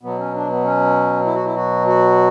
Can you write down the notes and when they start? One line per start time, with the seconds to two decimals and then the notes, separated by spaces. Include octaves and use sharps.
0.03 B2 F#3 B3
0.18 C#4
0.34 D4
0.49 B3
0.64 C#4
1.25 E4
1.35 F#4
1.45 E4
1.56 F#4
1.87 F#4